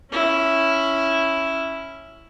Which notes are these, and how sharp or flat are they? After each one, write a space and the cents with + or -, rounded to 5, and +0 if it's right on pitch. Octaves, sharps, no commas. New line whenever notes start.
C#4 +0 E4 +0